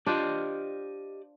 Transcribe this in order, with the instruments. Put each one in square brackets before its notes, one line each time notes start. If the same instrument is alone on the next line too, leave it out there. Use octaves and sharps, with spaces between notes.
[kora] D4 F4 C5 [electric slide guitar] G4 D5 D#5